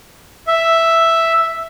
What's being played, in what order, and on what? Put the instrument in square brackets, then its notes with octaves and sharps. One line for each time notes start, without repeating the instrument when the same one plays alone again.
[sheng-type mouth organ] E5